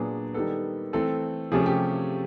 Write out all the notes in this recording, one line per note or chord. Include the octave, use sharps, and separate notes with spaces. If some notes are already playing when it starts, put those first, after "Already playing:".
Already playing: A#2 F#3 B3 D4 G#4
D#3 G3 B3 A4
E3 A3 C4 A4
C3 F3 A3 C#4 G#4
G4